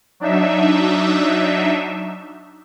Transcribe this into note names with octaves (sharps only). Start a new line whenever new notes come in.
F#3 D4 D#4 E5